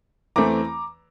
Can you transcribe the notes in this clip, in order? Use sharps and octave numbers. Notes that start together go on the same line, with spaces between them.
E2 E3 A3 C4 A#5 D6